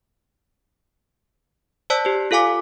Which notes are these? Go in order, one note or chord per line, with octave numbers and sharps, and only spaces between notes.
C5 D5 A5 E6 F#6 B6
G4 C5
F4 A4 F5 G#5 D6 B6